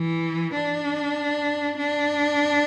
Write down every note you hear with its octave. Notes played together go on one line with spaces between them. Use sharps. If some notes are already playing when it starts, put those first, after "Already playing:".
Already playing: E3
D4
D4